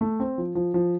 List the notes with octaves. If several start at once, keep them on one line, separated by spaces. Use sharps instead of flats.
A3
C4
F3
F3
F3